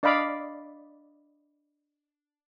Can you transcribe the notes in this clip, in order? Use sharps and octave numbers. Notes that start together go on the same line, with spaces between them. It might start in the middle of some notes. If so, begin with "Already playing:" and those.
D4 D5 D#5 F5 B5 D6